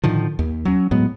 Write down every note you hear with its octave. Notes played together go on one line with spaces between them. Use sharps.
A2 D3 D#3 F3
D#2
F#3 C#4
A2 F#3 G#3 B3